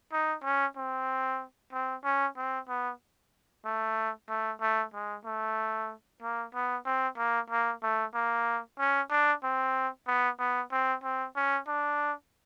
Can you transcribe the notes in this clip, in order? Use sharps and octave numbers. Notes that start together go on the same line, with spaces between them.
D#4
C#4
C4
C4
C#4
C4
B3
A3
A3
A3
G#3
A3
A#3
B3
C4
A#3
A#3
A3
A#3
C#4
D4
C4
B3
B3
C4
C4
C#4
D4